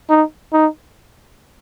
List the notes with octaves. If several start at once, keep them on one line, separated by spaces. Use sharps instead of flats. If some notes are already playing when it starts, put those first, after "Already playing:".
D#4
D#4